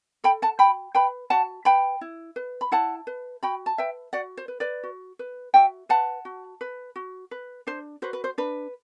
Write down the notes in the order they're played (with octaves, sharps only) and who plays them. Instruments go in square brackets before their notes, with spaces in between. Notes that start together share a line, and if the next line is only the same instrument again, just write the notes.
[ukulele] A4 G5 B5
F#5 A5
F#4 G5 B5
B4 G5 B5
F#4 F#5 A5
B4 G5 B5
E4
B4
B5
E4 F#5 A5
B4
F#4 G5 B5
A5
B4 E5 G5
F#4 D5 F#5
C5
B4
B4 D5
F#4
B4
F#4 E5 G5
B4 F#5 A5
F#4
B4
F#4
B4
D4 C5
F#4 B4 C5
B4
C5
D4 B4